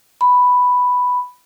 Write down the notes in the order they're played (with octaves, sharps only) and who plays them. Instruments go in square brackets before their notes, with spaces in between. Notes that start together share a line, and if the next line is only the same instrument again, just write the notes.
[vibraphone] B5